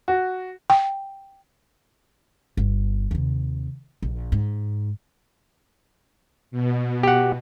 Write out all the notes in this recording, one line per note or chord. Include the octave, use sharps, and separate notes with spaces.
F#4
G5
G1
D#2 C3
A#1
G#2
B2
G4 F#5